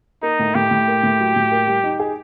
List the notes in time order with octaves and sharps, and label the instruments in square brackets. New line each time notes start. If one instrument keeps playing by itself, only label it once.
[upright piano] A#3 [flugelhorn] D#4
[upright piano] A2
[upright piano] A2 [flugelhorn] G4
[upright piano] A2
A#3
A2
F#3
A2
A#3
G3
D#4
G#4